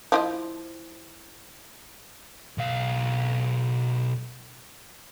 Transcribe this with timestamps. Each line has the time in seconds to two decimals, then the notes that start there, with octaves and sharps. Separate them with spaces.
0.12 F3 E4 D#5
2.58 B1 F5